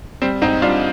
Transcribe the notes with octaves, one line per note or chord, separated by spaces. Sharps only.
G3 C4
G#2 C4 D#4
G3 D4 F4